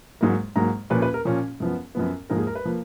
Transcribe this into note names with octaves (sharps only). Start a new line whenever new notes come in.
G#2 F#3 A#3
G#2 F#3 A#3 A#5
A#2 F3 A#3 C#4 B4
B4
A#4
A#2 F3 A#3 C#4
F#2 F3 B3
F#2 F3 B3
G#2 F3 A#3 A#4
G#4
A#4
B4
F3 A#3